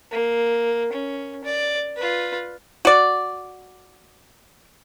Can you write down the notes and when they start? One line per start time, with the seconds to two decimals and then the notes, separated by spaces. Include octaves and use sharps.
0.11 A#3
0.93 C#4
1.45 D5
1.97 F4 B4
2.85 F#4 D5